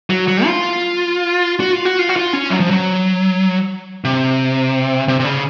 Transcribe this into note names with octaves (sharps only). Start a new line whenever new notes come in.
F#3
F#3
F4
F#4
F4
F#4
F4
F#4
F4
C#4
F#3
F3
F#3
C3
C3
C3
C#3